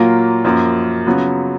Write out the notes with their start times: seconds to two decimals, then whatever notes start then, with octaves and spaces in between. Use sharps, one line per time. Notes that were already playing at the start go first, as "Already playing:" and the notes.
Already playing: A#2 F#3 A#3 F4
0.45 F#2 F3 A#3
1.06 C#3 F#3 B3 F4